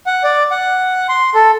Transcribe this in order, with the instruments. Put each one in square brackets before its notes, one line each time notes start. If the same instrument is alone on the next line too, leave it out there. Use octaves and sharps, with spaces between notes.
[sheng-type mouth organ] F#5
D5
F#5
C6
A4